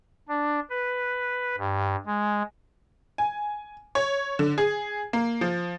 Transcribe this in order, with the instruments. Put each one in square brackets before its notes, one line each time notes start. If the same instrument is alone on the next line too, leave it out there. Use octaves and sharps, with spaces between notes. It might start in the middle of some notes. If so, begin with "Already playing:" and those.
[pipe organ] D4
B4
G2
G#3
[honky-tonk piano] G#5
C#5
D3
G#4
A#3
F3